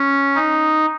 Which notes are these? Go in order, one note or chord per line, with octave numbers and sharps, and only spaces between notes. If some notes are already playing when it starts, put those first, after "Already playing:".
Already playing: C#4
D#4